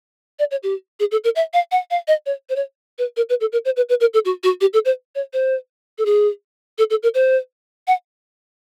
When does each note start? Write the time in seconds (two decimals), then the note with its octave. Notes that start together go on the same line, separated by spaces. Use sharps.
0.39 D5
0.51 C#5
0.63 G4
1.00 G#4
1.12 A4
1.24 A#4
1.36 E5
1.54 F5
1.72 F#5
1.91 F5
2.08 D#5
2.26 C#5
2.49 C5
2.56 C#5
2.99 B4
3.17 A#4
3.29 B4
3.41 A4
3.52 A#4
3.65 C5
3.76 B4
3.89 B4
4.01 A#4
4.14 A4
4.25 F#4
4.43 F#4
4.61 G4
4.74 A4
4.85 C5
5.15 C#5
5.33 C5
5.98 A4
6.06 G#4
6.78 A4
6.90 A4
7.03 A#4
7.14 C5
7.87 F#5